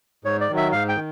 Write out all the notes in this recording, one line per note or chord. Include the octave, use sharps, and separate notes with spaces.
G#2 C#5
D5
D#3 F#3
E5
G#2 F5
G5
D#3